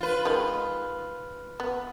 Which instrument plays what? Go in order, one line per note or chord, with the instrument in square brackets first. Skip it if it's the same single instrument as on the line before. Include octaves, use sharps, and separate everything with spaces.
[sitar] F4 B4
[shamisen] D#3 G#3
B3